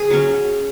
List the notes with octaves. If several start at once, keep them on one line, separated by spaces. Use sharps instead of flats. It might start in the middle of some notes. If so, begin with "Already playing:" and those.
Already playing: G#4
F#3 C#4